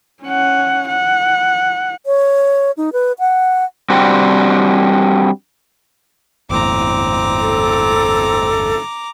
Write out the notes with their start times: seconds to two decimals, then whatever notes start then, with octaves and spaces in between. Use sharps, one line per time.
0.23 C#4 F#5
0.88 F#5
2.06 C#5
2.77 D#4
2.93 B4
3.19 F#5
3.90 G3 C4 D4 F#4
6.50 G1 E2 A2 C4 A#5 D6
7.40 A4